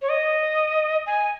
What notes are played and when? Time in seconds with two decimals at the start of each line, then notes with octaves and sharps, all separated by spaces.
0.02 C#5
0.09 D#5
1.06 G#5